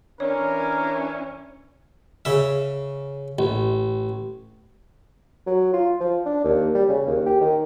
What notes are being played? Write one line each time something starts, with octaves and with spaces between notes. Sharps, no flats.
E3 C#4 D4 A#4 C#5
C#3 E5
A1
F#3
F4
F3
D4
D#2
G3
C#3
D#2
G4
D#3